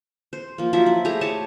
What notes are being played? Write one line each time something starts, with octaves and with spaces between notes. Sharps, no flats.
C5
F3 A#3
F3 F#3 E5
E4
A3 G4 G#4 A#5
C#5 D#5 A5